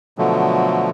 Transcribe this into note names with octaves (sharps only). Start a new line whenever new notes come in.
B2 D3 F3 F#3 A3